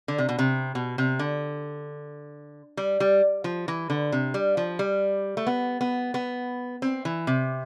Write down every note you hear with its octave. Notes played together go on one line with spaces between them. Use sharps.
D3
C3
B2
C3
B2
C3
D3
G3
G3
F3
E3
D3
C3
G3
F3
G3
A3
B3
B3
B3
C4
E3
C3